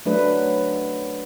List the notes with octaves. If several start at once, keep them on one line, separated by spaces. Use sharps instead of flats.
F#3 A3 D4 B4